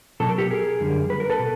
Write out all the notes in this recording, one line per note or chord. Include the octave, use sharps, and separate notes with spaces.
B2 F#3 A4
A#4
G4 A4
G#4 A#4
F#2 D3 G3
B4
A#4
A4 B4
B2